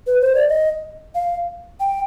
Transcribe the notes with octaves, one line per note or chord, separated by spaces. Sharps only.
B4
C5
D5
D#5
F5
G5